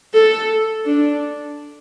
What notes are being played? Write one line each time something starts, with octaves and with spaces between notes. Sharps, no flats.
A4
D4